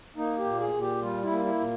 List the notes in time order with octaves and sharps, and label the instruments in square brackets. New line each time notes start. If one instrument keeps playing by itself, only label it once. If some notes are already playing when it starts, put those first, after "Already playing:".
[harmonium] A#3 D#4
G4
A#2
G#4
A#2
G4
G3 F4
E4
A#3
E4
A#2